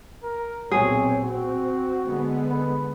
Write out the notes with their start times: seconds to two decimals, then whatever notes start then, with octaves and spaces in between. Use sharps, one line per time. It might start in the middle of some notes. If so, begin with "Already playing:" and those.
0.23 A#4
0.71 B1 A#2 C4 G#4 C#5
1.23 C4 F#4
2.07 D3 G#3 B3
2.50 B4